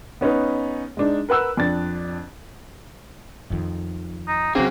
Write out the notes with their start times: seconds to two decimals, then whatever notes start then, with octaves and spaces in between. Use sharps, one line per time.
0.21 B3 C#4 D#4 B4
0.97 G#3 D4 D#4
1.29 A#4 B4 F#5 E6 F#6
1.57 F2 D4 A6
3.50 F2 D#3
4.28 D#4
4.55 F3 F#3 A#3 C4 C#4 F#4 G#4